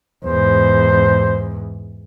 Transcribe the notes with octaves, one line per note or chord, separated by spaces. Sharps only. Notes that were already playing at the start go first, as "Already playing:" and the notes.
E2 G#2 C5